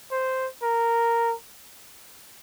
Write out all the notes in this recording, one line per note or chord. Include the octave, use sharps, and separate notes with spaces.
C5
A#4